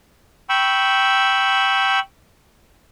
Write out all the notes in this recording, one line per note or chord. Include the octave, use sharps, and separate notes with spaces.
G5 B5 C#6 E6